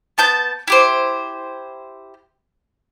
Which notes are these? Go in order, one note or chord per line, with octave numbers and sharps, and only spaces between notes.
B3 A5 G6
E4 G4 C5